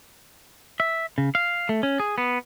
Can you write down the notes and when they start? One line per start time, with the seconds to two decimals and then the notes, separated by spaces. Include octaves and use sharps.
0.80 E5
1.18 C#3
1.35 F5
1.69 A3
1.83 C#4
2.00 G#4
2.18 B3